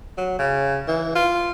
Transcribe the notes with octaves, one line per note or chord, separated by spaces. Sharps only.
F#3
C#3
E3
F4